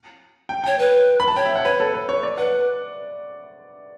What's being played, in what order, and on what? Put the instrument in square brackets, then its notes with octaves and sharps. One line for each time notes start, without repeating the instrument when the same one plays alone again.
[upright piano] G5
[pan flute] C#5 [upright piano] G5
[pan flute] B4
[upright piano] B5
A5
[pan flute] C#5 [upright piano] G5
[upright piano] E5
F#5
[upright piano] B4 [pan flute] C#5
[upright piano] A4
B4
C#5
D5
[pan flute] B4 [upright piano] F#5